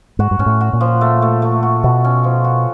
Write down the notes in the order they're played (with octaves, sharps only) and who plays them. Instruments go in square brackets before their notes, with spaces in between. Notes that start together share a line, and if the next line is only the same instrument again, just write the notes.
[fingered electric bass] G#2 [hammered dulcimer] F#4
[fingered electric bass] G2
[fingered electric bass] G#2 [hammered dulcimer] C#4
[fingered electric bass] A2
[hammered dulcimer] F#4
[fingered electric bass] A#2
[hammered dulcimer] F3
A3
A3
A3
F#4
[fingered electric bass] B2 [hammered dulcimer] F#4
[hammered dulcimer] C#4
F3
F#4